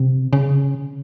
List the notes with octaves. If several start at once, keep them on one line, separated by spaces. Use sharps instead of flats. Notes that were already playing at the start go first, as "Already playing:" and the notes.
Already playing: C3
C#3